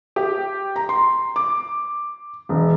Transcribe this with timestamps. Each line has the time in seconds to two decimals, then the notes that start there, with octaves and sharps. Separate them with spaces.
0.16 G4
0.76 A#5
0.89 C6
1.36 D6
2.49 E1